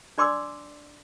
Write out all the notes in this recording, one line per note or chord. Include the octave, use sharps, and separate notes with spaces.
D4 D5 C6 D6 E6